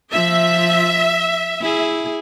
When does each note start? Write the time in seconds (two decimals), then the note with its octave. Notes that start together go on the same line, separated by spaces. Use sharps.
0.13 F3 F4 E5
1.60 E4 G#4